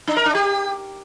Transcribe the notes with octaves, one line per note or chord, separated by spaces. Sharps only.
D4
A#4
D4
G4